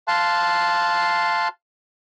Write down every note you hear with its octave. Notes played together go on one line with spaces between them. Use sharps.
F5 A5 C6 F#6